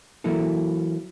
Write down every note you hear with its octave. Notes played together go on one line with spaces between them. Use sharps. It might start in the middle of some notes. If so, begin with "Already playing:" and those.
E3 F#3 A#3 E4 A4